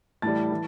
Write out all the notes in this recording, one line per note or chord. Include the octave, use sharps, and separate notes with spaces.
A2 E3 G3 A5 A6
E3